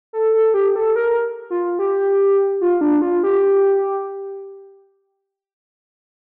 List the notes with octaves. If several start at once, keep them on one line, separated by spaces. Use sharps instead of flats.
A4
A4
G4
A4
A#4
F4
G4
F4
D4
F4
G4